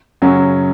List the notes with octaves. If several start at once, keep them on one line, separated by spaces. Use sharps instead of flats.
F#2 C#3 F#3 C#4 F#4